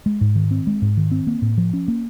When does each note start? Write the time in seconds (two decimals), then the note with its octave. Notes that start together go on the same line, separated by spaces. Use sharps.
0.06 G#3
0.21 G#2
0.36 D#3
0.51 C4
0.67 G#3
0.82 G#2
0.97 D#3
1.11 C4
1.27 A#3
1.42 A2
1.58 F3
1.73 C#4
1.88 A#3